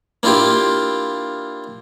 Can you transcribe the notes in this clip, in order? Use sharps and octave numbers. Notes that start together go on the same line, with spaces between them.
A#3 D4 E4 F4 G4